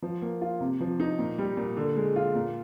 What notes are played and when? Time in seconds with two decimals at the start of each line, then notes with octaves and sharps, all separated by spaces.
0.02 F3
0.22 A#3
0.41 F4
0.60 C3
0.80 F3
1.00 D#4
1.19 A#2
1.38 G3
1.57 A#2
1.77 D3
1.96 G#3
2.16 F4
2.35 A#2